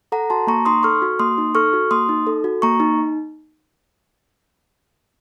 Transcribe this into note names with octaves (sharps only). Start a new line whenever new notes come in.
A4 F#5 A#5
F#4 A5 C6
A#3 A#5 C#6
D#4 C6 D#6
A4 C#6 F6
F#4
A#3 C6 D#6
D#4
A4 C#6 F6
F#4
A#3 C6 D#6
D#4
A4
F#4
A#3 A#5 C#6
D#4